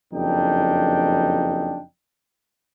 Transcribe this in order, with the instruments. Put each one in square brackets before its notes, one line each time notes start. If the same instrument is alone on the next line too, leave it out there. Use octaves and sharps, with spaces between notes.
[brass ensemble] F#1 F2 D4 D#4 G5